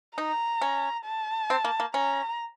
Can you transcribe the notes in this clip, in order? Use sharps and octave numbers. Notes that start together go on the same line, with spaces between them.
D#4 A#5
C#4
A5
C4
A#3
A#3
C#4 A#5